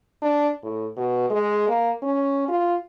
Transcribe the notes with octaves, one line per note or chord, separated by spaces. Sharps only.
D4
A2
B2
G#3
A#3
C#4
F4